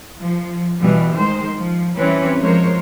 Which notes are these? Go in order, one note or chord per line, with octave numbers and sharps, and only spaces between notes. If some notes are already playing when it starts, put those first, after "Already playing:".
F3
B2 E3 G3
D#3 G#3 C5
F3
E3 G3 C4 C#4 B4 C#5
F3 G#3 A#4 C5 C#5